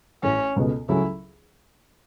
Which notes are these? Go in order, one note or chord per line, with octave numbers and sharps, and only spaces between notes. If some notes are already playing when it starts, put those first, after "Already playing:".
A1 A2 E3 C#4
C#2 B2 B3 A4
C#2 C#3 F#3 C#4 E4 A4